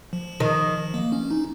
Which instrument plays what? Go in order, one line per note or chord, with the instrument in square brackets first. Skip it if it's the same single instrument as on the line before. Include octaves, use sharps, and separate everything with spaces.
[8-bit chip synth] F3
[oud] D#3
[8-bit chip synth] A#3
C#4
D#4